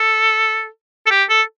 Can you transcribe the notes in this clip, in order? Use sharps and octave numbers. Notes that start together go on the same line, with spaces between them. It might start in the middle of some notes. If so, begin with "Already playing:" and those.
Already playing: A4
A4
G4
A4